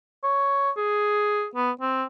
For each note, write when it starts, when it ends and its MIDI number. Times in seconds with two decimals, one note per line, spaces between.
0.24 0.71 73
0.77 1.46 68
1.56 1.71 59
1.81 2.04 60